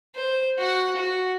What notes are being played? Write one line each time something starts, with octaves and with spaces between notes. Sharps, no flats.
C5
F#4 F#5
F#4